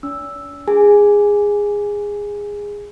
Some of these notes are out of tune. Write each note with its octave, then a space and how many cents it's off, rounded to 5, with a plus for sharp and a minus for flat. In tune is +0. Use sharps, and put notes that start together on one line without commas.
D4 -45 E6 +0
G#4 -15 G#5 +0